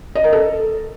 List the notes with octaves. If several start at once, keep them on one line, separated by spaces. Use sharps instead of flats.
D#5
A#4
A4